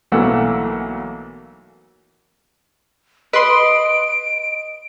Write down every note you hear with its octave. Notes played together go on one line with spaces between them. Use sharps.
B1 E3 A3 A#3 F#5 E6
B4 D#5 C6 D7